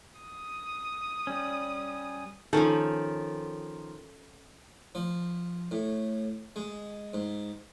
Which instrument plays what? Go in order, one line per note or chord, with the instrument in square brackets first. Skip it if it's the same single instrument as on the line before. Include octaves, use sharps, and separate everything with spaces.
[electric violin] D#6
[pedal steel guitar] G3 C#4
[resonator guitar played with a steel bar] D#3 F3 [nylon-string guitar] C#4 A4
[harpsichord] F3
A2
G#3
G#2